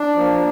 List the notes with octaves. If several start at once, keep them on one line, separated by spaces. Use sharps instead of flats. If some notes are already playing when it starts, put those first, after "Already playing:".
Already playing: D4
F3 A#3